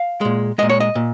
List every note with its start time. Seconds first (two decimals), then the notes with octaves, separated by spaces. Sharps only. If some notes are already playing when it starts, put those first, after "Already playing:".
Already playing: F5
0.21 A#2 G#3
0.58 A#2 G#3 D#5
0.69 C#5
0.80 D#5
0.95 A#2